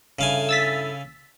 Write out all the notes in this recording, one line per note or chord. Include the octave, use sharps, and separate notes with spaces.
G2 C#3 A3 E4 F5 G#5
E6 A6 B6